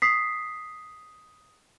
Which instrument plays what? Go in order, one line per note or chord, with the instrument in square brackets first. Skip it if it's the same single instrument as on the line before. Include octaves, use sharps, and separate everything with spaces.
[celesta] D#6 B6 C7